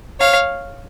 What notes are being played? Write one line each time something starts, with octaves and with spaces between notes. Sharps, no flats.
C#5 F5